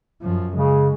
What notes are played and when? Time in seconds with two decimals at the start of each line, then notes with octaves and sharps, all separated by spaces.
0.22 F#2 F3
0.56 C#3 G#3